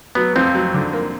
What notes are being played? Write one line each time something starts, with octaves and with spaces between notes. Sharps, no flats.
F#3 B3
F2 C4
F#3
D3
A#3